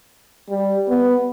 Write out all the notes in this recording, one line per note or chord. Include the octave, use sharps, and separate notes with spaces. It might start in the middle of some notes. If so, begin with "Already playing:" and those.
G3
B3